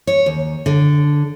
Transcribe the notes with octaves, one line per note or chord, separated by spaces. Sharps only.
C#5
D#2
D3